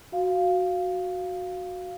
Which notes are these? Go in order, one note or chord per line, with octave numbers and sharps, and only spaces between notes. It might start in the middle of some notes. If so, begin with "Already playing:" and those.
F#4 F5